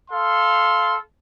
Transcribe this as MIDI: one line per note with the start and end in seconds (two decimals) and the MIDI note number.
0.11 0.97 69
0.11 0.97 77
0.11 0.97 84